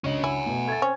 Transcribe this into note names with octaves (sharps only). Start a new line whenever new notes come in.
C#2 F#3 C#4 D4 D#5 F#7
E4 F#5 G#5
B2 A3
A3 G#6 A6
C4 C#4